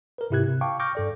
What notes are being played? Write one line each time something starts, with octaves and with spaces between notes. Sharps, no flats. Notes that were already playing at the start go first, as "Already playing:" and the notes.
A#4 B4
G#2 C3 E4 G4 F#6 G#6
C3
F5 G5 A5 C#6 D6
C#6 D6 F6 G6 A#6
G2 A4 D5